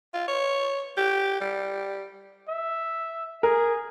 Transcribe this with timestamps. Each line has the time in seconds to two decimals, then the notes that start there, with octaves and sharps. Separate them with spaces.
0.14 F4
0.28 C#5
0.97 G4
1.41 G3
2.48 E5
3.43 G#4 A#4